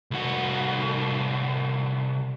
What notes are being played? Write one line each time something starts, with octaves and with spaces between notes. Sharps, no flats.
C2 F#4